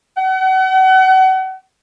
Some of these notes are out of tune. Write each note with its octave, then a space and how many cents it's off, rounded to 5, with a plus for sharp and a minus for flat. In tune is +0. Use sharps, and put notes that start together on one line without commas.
F#5 +35